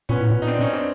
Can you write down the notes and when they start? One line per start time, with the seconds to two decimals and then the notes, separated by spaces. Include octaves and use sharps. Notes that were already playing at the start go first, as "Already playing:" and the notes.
0.09 A#2 B3 C#4
0.20 A2
0.31 A#2
0.42 D#4
0.47 C4 D4
0.61 C#4 D#4
0.73 C4 D4